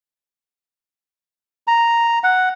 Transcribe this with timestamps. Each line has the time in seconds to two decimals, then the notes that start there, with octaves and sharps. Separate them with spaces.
1.67 A#5
2.24 F#5